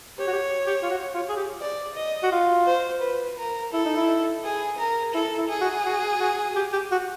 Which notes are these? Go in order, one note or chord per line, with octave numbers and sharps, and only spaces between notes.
G4 C#5
F#4
G4
G4
F4
F#4
F4
G#4
G4
D5
D#5
F#4
F4
C5
B4
A#4
E4 A4
D#4
E4
G#4
A#4
E4 A4
E4
G#4
F#4
F#4
F#4
G4
G4
F#4